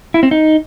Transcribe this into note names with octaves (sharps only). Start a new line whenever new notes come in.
E4
C4
D#4